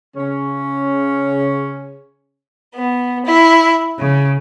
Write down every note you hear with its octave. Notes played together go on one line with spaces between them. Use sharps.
C#3 C#4
B3
E4
C#3